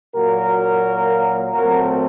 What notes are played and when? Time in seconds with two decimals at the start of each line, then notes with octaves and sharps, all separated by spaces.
0.14 A#2 F#3 A#3 F#4 A#4
1.53 A#2 F#3 A3 C4 F#4 A#4